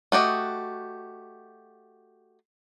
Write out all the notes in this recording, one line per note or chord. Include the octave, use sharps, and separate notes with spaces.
A3 F#4 G4 D#5